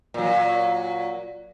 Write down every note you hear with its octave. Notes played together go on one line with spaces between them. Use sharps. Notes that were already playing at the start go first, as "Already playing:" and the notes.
A#2 F#3